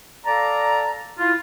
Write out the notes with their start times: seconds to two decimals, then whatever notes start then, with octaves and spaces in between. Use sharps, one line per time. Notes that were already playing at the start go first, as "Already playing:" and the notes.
0.25 A4 D5 F5 A5 A#5
1.19 E4 F4